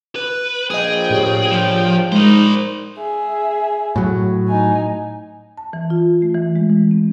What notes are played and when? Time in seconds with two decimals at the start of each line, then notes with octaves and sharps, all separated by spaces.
0.16 B4
0.70 A#1 G#4 D#5 G5 D#6
1.10 A2 G4 C#5
1.52 F3
2.12 G#3 D#4 A#4 C5
2.98 G#4 E5
3.96 A2 F#3
4.49 D#4 G#5
5.57 A5
5.73 E3
5.90 F4
6.22 A3
6.35 E3
6.56 G#3
6.70 E3
6.91 C4